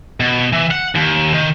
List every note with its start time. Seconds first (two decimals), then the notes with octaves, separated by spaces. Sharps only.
0.20 B2
0.52 E3
0.71 F#5
0.95 D#2
1.34 D#3